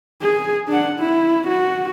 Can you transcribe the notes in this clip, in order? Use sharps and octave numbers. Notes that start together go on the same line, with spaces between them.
G#4
D4 F#5
E4
F#4